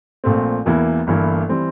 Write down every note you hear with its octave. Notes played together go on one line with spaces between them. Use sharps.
A#1 A#2 A3 C4
E1 E2 E3 A#3 E4
G1 G2 E3 A#3 E4
E3 G3 C4